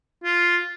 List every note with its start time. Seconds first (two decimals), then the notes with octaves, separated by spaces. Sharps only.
0.24 F4